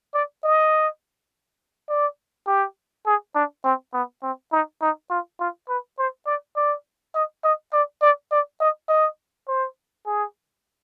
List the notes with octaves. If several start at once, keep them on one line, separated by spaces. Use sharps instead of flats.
D5
D#5
D5
G4
G#4
D4
C4
B3
C4
D#4
D#4
F4
F4
B4
C5
D5
D5
D#5
D#5
D5
D5
D5
D#5
D#5
C5
G#4